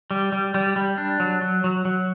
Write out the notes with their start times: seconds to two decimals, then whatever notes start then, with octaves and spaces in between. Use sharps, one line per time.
0.11 G3
0.32 G3
0.54 G3
0.76 G3
0.98 D4
1.20 F#3
1.42 F#3
1.64 F#3
1.85 F#3